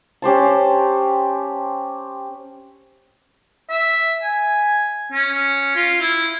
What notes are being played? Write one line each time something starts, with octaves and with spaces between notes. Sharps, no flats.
C#4 G4 C5 A5
E5
G#5
C#4
F4
E4